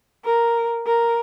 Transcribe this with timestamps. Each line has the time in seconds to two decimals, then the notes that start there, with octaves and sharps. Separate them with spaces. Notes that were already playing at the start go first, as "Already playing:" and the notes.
0.25 A#4
0.86 A#4